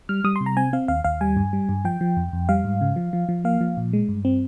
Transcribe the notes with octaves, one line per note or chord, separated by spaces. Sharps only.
G3 F6
G3 D#6
C6
C3
A#5
C4 G#5
C4 F5
D#2 F5
D#2 F5
G3 G#5
G2
G3
G2
F3 G5
F3
F2
F2
G3 F5
G#2
C#3
F3
F3
F3
A#3 F5
F3
A#2
G#3
G2
C4